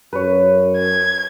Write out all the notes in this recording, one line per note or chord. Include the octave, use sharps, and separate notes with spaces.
F#2 B4 C#5
G#6